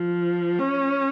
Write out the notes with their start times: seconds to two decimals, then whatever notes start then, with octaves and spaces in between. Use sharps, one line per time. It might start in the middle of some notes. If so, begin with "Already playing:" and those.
Already playing: F3
0.59 C#4